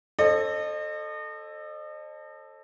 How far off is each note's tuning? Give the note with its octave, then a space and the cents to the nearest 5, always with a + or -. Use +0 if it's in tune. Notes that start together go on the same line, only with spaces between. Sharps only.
A4 +0 C5 +40 D#5 -35